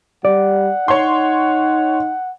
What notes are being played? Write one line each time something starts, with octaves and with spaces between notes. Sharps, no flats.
G3 D5 F#5
D#4 C#5 C6